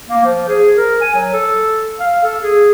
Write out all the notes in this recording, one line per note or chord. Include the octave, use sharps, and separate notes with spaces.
A#3
F3
G#4
A#4
G#5
F#3
A4
F5
A4
G#4